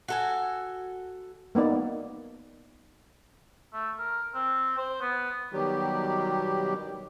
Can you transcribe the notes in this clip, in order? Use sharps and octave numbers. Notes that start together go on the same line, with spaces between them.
F#4 A4 G#5
A#3 B3 D#4 D5
A3
A#4
C4
C5
B3
B2 D#3 F#3 G3 G4